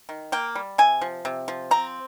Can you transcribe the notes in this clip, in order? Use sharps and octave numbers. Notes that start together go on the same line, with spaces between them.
D#3
A#3 G5
G3
C3 G#5
F3
C3
F3
C4 A#5